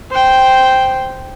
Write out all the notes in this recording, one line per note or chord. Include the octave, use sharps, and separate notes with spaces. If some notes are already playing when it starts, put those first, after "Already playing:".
C5 G5